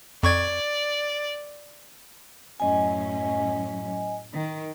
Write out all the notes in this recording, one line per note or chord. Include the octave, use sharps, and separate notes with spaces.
F2 D5 C#6 G#6
F#2 A2 C#4 D#5 G#5
D#3